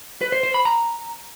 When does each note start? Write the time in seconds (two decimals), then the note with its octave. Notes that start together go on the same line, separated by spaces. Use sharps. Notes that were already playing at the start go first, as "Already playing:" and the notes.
0.21 B4
0.32 C5
0.43 C5
0.54 B5
0.65 A#5